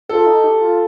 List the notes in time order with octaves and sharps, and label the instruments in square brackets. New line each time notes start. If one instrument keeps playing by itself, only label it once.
[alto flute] F4 [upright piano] A4
[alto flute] D#4
G4
F4